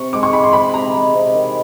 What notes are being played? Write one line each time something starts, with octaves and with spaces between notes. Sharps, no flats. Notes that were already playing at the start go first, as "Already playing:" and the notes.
Already playing: C3 C#6
G#3 D6
C#6
G#3 B5
C6
G#3 B5
C3 A#5
G#3
C3
D#3